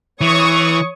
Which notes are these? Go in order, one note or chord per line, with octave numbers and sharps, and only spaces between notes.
E3 C#5 C#6 D#6